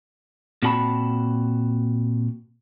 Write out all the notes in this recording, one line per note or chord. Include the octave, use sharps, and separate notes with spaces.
A#2 C4 F#4 A5 B5